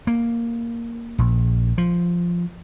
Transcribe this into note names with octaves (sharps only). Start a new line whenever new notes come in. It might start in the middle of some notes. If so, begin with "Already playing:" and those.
A#3
A#1
F3